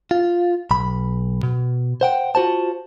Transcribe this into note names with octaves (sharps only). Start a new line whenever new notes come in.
F4
B1 B5
B2
C5 F#5 G5
F4 F#4 C5 A5